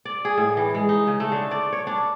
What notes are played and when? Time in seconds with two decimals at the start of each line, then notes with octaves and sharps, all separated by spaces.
0.05 D5
0.25 G#4
0.38 A2
0.57 E3
0.75 G#3
0.89 D#4
1.07 C#3
1.20 A3
1.32 D3
1.51 D5
1.72 C#5
1.87 D4